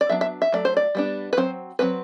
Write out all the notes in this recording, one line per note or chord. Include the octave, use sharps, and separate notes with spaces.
D5
F#3 B3 D4 E5
E5
E5
F#3 A3 D5
C5
D5
G3 B3 D4
B4
F#3 C4 C5
F#3 A3 C4 B4